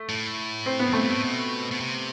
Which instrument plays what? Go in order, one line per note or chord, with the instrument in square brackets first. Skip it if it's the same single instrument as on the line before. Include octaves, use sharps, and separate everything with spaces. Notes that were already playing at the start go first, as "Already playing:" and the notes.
Already playing: [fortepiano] A3
[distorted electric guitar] A2
[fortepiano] C4
B3
[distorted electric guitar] F2
[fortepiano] A3 C4
[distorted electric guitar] G2
A2
B2
B2
C3